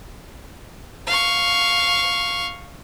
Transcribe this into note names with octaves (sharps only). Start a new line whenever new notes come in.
F5 C#6